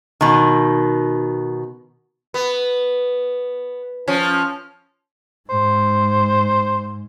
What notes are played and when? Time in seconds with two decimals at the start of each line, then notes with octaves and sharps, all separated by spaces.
0.21 B2 D#3
2.34 B3
4.08 F3 C#4
5.50 G#2 C5